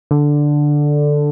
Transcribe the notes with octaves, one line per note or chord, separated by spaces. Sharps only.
D3